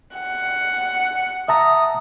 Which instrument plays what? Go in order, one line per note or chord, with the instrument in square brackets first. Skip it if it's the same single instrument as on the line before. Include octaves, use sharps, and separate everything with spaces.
[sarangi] F#5
[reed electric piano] E5 A5 A#5 [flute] D#6